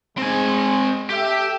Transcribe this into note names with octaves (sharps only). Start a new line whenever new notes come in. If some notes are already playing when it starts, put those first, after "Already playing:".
G#3 C4 G#5
G4 A4 E5 G5